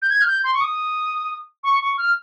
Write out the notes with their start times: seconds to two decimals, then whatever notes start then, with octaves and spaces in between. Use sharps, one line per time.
0.02 G6
0.10 G#6
0.21 F6
0.27 G6
0.44 C6
0.54 C#6
0.61 D#6
1.64 C#6
1.81 C#6
1.98 F6